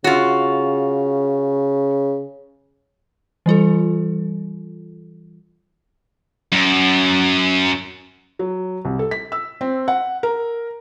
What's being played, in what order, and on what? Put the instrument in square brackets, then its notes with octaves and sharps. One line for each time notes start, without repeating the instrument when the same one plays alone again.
[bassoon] C#3 [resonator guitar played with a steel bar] F4 F#4
[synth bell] E3 G3 F4 A4
[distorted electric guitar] F#2
[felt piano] F#3
C2
A4
B6
E6
C4
F#5
A#4